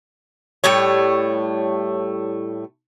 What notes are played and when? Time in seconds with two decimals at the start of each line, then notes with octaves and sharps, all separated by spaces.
0.64 A2 G3 A3 C#5